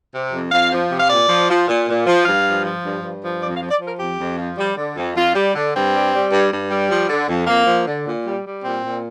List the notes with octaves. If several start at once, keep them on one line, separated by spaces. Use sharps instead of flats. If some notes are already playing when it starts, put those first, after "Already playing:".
C3
F2
F2 F5
F3
C3
F5
A#2 D5
F3
F3
A#2
A#2
F3
G2 F5
F3
F3
G2
G2
F3
F2 D5
F5
F3
D5
F3
A#4
F2 G4
F2
F3
G3
D3
F2
F2 F4
G3
D3
G2 C4
G3
G3
G2
G2
G3
F3
D3
F2
F2 A#3
F3
D3
A#2
G3
G3
A#2 C4
A#2